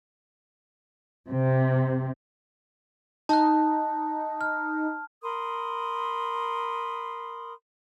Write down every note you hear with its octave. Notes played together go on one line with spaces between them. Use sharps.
C3
D#4 A5 F#6
F6
A#4 B5 C6 D#6